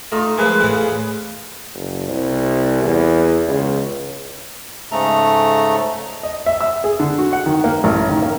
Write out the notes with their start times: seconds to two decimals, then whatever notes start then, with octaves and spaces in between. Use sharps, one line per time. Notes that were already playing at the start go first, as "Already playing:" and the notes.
0.12 A3 D#4 F4 A#5 D#6
0.38 F3 G#3 A#3 G#4 B4
0.61 E2 A2 E3
1.74 F#1
2.08 C2
2.83 E2
3.47 C#2
4.92 G#2 C#3 A3 A4 A#5
6.23 D#5
6.46 E5
6.61 E6
6.84 G#4
7.00 D3
7.19 F#4
7.33 F#5
7.46 D#3
7.64 A#3
7.84 A1
8.09 D#3
8.22 A#3